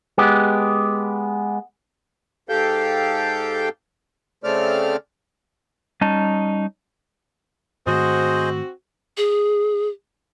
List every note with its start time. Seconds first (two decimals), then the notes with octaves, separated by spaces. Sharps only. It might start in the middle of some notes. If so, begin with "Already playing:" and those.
0.18 G#3 B3 G4
2.49 G#2 G4 A4 F5 G5 G6
4.44 C#3 A3 C4 D5 F6
6.01 G3 C#4 D#4 D#5 A5
7.87 G#2 D#3 A3 C4 F#4 G#4 C5 D#5
9.17 G#4